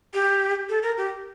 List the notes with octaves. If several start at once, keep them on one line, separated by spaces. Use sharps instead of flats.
G4
A4
A#4
G4